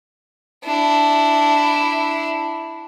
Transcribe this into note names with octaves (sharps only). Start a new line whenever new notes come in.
D4 E4